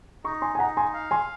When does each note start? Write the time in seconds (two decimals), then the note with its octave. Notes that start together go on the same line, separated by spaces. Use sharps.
0.24 D#4 A#5 C#6
0.42 G#5 C6
0.55 G#5
0.59 D#4 F#5 A#5
0.77 G#5 C6
0.94 F5
1.11 G#5 C6